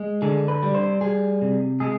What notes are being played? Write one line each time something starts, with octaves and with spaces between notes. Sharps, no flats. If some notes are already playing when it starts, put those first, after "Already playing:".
Already playing: G#3
D3 G#4
B4
G3
C5
G3 G#4
C3
G#3 G#4